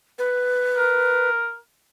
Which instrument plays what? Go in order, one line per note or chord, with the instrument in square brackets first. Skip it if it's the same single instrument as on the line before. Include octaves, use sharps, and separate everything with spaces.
[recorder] B4
[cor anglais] A#4